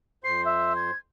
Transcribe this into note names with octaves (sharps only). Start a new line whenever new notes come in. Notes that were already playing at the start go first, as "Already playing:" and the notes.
F2 C5 C6 C7
E5
G#6